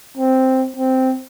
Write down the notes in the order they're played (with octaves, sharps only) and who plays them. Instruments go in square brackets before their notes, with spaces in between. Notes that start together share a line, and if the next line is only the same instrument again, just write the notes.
[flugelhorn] C4
C4